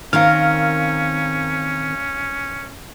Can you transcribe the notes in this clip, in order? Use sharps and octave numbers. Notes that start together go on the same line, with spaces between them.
D#3 C4 C#4 A#4 F5 F6